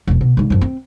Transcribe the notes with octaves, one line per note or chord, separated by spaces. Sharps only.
E1 F3
B2
G#2 C#3
F#2 F3
C4